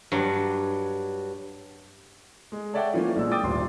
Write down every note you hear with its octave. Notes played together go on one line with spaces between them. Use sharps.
G2 F#3
G#3
A4 C#5 D5 E5 F#5 G5
E3 F3 A3 A#3 C#4
A#1 G#3 E6
G5 D6 D#6 A6
D#1 G#1 D2 C6